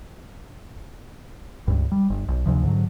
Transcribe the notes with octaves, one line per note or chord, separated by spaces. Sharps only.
C#2 G2
G3
G1
B1
D2 C3 F3
G#2 D3 F3 F#3